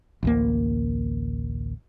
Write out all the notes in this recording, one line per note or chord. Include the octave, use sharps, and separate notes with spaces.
A1 D2 A#3